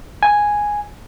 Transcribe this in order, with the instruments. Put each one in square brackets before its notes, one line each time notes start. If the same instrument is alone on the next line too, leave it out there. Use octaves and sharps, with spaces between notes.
[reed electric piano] G#5